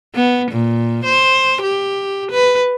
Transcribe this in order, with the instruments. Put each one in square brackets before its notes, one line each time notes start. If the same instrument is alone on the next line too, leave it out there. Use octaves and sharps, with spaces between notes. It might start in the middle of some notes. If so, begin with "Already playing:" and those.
[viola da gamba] B3
A#2
C5
G4
B4